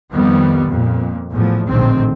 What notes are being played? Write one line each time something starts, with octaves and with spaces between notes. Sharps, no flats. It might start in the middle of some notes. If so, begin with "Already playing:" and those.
F2 D#3 G3 B3
F2 A#2
E2 A2 F3
A#1 A2 D3 D#3 C4